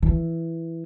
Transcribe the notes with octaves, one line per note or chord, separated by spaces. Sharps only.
E3